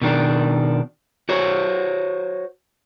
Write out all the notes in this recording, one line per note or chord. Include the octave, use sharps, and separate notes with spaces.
B2 D#3 D4
F#4 C5 C#5